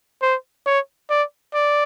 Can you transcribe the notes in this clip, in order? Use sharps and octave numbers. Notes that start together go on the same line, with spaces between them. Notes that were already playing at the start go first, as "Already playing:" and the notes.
C5
C#5
D5
D5